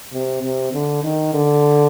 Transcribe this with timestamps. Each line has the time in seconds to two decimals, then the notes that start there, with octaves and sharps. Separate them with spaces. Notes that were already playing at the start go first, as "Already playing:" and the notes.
0.13 C3
0.43 C3
0.73 D3
1.04 D#3
1.34 D3